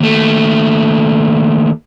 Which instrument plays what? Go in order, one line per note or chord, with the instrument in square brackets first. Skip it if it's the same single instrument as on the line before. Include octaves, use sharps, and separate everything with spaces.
[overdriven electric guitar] D#2 A3